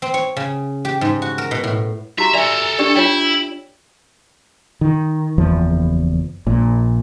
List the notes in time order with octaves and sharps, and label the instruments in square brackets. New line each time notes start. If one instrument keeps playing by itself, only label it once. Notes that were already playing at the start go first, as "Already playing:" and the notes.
[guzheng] C4
C#5
C#3
G4
G#2
F#4
A#4
B2
A2
[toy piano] F#4 G4 A#5 [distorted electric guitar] E5
[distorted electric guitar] A4 A#5 [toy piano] D5 E5 G#5
[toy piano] D4 G4 D5
[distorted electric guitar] E4 [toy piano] F4 C#5 G5
[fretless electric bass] D#3
F#1 E2 F3
A#1 A#2